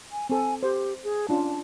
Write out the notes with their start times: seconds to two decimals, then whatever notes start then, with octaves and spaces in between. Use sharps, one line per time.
0.12 G#5
0.30 C4 A4 G#5
0.63 G4 C5
1.04 G#4
1.29 C#4 D4 F4 A5